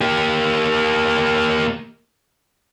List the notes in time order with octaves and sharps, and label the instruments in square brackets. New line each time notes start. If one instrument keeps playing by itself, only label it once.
[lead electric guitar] A#3 G4